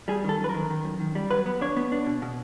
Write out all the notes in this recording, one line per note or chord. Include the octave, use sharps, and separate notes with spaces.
G3 G#4
D#3 A4
F#2
B4
D#3 A#4
D#3
F#2
D#3
G3
F#3 B4
B3
D4 C#5
B3
D4
B2
B2